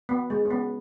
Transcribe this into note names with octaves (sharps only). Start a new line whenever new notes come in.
B3
G#3
C#4
B3